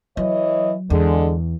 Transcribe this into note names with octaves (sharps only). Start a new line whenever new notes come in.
E3 F#3 C#5 D#5
E2 D3 G#3